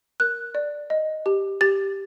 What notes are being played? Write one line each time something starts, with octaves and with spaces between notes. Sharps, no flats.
A#4 F#6
D5
D#5
G4
G4 A6